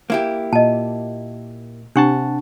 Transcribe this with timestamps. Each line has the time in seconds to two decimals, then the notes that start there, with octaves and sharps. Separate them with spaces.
0.10 A#3 E4 G4
0.53 A#2 D#5 A5
1.96 C3 D4 G4 F#5 A5 C#6